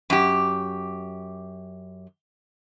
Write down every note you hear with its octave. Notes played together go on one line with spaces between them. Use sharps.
F#2 G4